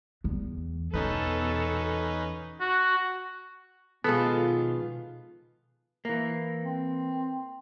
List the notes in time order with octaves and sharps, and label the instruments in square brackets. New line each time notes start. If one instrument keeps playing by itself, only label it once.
[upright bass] E2
[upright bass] E2 [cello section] B2 A4 [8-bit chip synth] C#4 D#4 B4
[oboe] F#4
[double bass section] B2 [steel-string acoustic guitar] D#3 F3 F4 [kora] G#3 A4 [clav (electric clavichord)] B3
[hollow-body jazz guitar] E3 A#3
[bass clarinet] C4